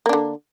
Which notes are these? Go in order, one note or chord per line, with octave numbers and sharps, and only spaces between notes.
D3 A#3 D4